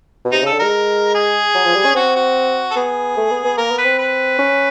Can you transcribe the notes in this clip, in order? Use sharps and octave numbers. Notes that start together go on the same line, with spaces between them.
B2
C3 D#4
C#3 A4
D3
G#3 A#4
G#4
F#3
F3
G3
C#4
C4 F#4
F#4
A4
B3 G#4
A3
B3
B3
A#3 A#4
B3
B4
C4
B4
C#4